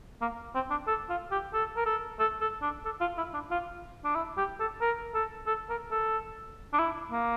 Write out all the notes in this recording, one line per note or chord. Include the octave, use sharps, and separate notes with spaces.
A#3
C4
D4
A4
F4
G4
A4
A#4
A4
A4
A4
D4
A4
F4
E4
D4
F4
D4
E4
G4
A4
A#4
A4
A4
A#4
A4
D4
E4
A#3